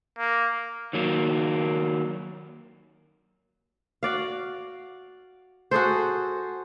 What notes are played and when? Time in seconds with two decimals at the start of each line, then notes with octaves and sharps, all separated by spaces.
0.19 A#3
0.93 D#3 F#3 A#3
4.03 F#4 D5 F5
5.71 F#4 G#4 A4 C5